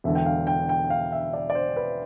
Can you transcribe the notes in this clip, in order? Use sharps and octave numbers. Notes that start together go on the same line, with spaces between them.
E1 E2 D3 E5
G5
F5
G5
G5
F5
E5
D5
D5
C5
B4